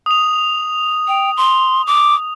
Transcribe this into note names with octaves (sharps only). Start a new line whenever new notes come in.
D#6 F7
G5
C6
D6